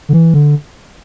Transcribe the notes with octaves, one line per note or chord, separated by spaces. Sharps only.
D3
E3
D3